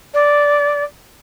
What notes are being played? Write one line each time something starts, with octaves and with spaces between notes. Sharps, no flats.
D5